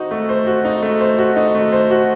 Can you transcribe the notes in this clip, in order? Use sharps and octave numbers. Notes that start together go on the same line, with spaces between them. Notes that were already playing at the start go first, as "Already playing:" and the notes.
Already playing: D#4 F#4 C5
A3
C5
F#4
D#4
A3
C5
F#4
D#4
A3
C5
F#4